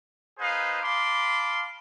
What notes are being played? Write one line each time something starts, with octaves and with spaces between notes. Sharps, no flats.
D#4 G#4 B4 C5 D#5 F5
F5 A5 B5 C6 D6